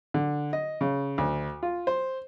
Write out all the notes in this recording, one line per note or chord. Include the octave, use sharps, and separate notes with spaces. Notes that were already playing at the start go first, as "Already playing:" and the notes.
D3
D#5
C#3
D2
F4
C5